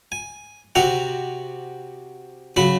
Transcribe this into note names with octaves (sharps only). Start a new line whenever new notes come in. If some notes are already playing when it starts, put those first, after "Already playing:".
G#5
C3 C4 F#4 F#5 A#5
C#3 F#3 F#4 B5